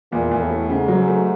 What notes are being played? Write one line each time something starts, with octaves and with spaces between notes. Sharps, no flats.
E2 A#2
E2
A2
A3
G#2 C#3
F#3
A3